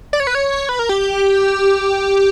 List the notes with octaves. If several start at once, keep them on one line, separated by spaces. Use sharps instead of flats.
D5
C#5
B4
C#5
B4
A#4
G4